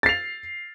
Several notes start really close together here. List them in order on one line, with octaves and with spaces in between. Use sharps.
A6 C7 F7